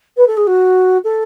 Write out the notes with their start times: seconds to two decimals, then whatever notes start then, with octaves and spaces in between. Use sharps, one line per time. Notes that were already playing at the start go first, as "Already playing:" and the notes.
0.16 B4
0.27 A4
0.37 G#4
0.47 F#4
1.04 A4